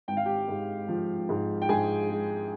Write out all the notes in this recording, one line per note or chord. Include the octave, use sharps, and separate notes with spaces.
G#1 G5
F5
G4 G5
G#2
F3
G#2
G5
G#2 G#4 G#5
G#3